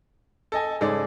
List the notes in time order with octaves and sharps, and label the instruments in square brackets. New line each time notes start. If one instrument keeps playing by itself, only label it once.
[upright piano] A4 D#5 G#5
[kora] G#2 C#3 G#3 [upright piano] A4 D5